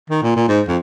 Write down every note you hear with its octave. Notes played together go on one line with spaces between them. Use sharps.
D#3
A#2
A#2
G#2
F2